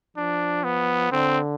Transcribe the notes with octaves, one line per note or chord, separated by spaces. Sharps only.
F3 D4
B3
D3 C4